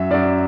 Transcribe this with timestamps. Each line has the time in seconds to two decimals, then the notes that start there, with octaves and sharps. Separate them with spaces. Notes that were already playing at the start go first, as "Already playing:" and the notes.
Already playing: F#2 F#3 E5
0.10 F#2 F#3 D5